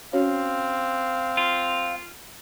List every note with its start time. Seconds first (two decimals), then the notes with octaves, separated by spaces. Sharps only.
0.13 C4 C#4 F#4 C#5 F5
1.37 F4